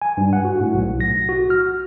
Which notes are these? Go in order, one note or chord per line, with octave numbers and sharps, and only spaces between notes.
G#5
G2
F#5
F#4
A2
B1
A#6
F#4
F6